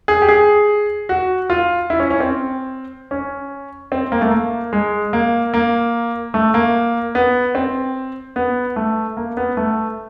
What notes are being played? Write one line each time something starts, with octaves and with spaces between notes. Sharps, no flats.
G#4
G4
G#4
F#4
F4
E4
C#4
C#4
C4
C#4
C4
A#3
A3
A#3
G#3
A#3
A#3
A3
A#3
B3
C4
B3
A3
A#3
B3
A3